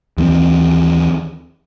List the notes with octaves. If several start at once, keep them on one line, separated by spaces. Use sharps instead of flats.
D#2 E3 B3 C4